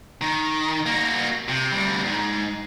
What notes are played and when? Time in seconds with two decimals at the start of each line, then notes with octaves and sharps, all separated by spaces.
0.21 D#3
0.86 A#3 F#4
1.49 C3
1.71 D2 G3
2.04 G#2